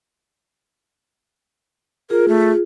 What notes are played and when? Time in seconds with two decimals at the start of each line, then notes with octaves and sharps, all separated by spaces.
2.10 F4 G#4 A#4
2.28 A3